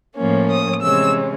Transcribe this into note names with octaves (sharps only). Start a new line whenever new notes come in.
A2 F3 A#3 C#4
D#6
C3 E3 G#3 C#4 E6